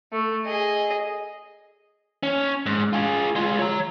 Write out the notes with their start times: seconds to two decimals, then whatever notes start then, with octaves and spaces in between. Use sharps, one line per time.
0.13 A3
0.47 G#4 D#5
2.23 C#4
2.66 G#2
2.93 F4 G#4
3.35 G#3 F4
3.60 C#5 A#5